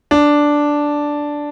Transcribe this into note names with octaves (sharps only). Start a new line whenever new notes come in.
D4